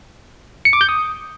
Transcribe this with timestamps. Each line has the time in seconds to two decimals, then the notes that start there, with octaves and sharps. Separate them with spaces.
0.65 C#7
0.73 D6
0.81 G6
0.89 D#6